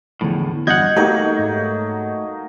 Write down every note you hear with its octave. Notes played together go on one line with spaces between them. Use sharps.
E2 A2 D3 F3
E2 G2 F#4 D#5 F#5 G6 G#6
F#3 A3 A#3 D#4 G4
G#2